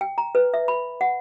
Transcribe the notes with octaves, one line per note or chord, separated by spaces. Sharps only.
G5
A#5
B4
E5
B5
F#5